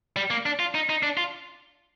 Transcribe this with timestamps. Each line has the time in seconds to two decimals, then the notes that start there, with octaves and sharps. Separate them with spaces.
0.16 G3
0.30 A#3
0.46 D4
0.59 F4
0.75 D#4
0.90 D#4
1.03 D4
1.17 F4